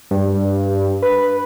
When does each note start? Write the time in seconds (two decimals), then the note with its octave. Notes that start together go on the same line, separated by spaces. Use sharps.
0.11 G2
1.02 B4